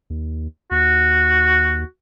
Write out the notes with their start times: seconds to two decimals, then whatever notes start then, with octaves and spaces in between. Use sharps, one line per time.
0.10 D#2
0.71 D#2 F#4